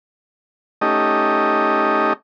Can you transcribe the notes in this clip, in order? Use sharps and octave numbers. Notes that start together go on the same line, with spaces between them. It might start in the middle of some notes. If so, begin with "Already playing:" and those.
A3 C#4 D#4 G4 D#5